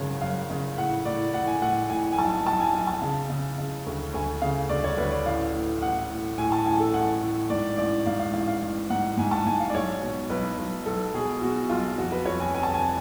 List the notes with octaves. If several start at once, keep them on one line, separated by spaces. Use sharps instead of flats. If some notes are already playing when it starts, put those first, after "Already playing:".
Already playing: G#1 F#2 C#3 C#5
F#2 F5
C#3
A2 F#5
A2 D5
A2 F#5
G#5
A2 F#5
A2 G#5
G#5
B1 A5
B1 A5
G#5
B1 G#5
A5
C#3
C#3
C#3
D2
D2 G#5
C#3 F5
D2 D5
C#5
D2 B4
D5
A1 F5
A2
A1 F#5
A2
A2 G#5
A5
A1 G#5
A4
A1 F#5
A2
G#2 D5
A1 D5
G#2 F5
F5
A1 F5
F5
A1
G#2 F#5
G#2 G#5
A5
G#2 G#5
F5
D5
B1 C#5
B2
B1 B4
B1
B1 A4
B2 G#4
B2 F#4
B1 F4
F2 F#4
B4
F2 C#5
G#5
F1 G#5
A5
G#5